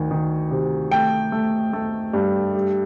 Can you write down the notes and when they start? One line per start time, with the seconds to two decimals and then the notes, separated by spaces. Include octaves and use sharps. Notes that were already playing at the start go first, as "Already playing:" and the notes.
Already playing: D2 D#3
0.11 D#3
0.51 C3
0.91 A3 G5
1.32 A3
1.73 A3
2.13 G2
2.55 G3